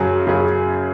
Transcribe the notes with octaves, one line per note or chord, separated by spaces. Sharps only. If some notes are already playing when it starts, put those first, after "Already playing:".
Already playing: F#2 C#3 F#3 C#4 G#4
F#2 C#3 F#3 C#4 G#4